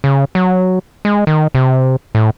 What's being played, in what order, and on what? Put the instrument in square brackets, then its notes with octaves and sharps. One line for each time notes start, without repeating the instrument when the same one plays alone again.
[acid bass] C#3
F#3
G#3
D#3
C3
A2